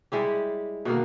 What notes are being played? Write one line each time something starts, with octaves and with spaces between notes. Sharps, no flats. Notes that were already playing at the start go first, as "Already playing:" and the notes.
G3 G#3 E4 G4
B2 D3 D#3 A#3